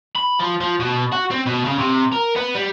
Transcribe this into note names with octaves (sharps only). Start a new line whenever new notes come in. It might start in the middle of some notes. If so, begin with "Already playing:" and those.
B5
F3
F3
B2
F#4
C4
B2
C#3
C3
A#4
B3
G3